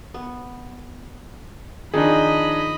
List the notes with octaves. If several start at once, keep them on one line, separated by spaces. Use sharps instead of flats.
B3
D#3 F3 C4 D4 D#4 G#4 D#5 B5